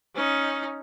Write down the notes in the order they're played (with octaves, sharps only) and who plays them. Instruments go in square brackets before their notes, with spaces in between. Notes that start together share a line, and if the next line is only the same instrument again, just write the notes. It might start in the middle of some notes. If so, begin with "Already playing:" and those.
[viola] C#4 D#4